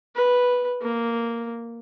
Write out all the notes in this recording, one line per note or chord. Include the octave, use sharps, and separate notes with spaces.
B4
A#3